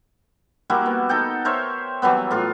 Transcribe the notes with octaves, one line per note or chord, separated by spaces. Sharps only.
G3 A#3 E4 F#4
B3
D#4 A4 G5
A#4 C5 C#5 E5
E3 F#3 G3 B3
A2 F4